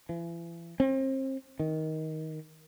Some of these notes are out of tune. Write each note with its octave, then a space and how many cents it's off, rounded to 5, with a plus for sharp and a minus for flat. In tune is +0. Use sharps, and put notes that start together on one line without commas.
E3 +40
C4 +35
D#3 +15